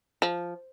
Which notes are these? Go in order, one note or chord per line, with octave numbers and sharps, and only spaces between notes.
F3